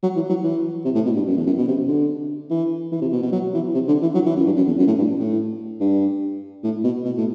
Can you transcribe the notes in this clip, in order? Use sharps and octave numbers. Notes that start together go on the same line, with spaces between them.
F#3
E3
F#3
E3
C3
A2
B2
G2
F#2
E2
F#2
B2
C3
D3
E3
E3
C3
B2
B2
F#3
E3
C3
D3
E3
F#3
E3
F#2
G2
F#2
E2
F#2
A2
G2
A2
G2
A2
B2
B2
A2